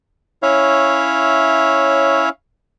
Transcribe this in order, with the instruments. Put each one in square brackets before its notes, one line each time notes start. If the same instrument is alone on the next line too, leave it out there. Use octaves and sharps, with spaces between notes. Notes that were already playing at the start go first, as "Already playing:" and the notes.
[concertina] C#4 E4 C#5 E5 F5